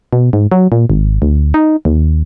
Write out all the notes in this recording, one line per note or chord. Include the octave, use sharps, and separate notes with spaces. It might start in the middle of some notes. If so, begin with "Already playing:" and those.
B2
G#2
F#3
A#2
G#1
D2
D#4
D#2